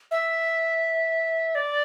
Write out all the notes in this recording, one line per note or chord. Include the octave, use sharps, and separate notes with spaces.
E5
D5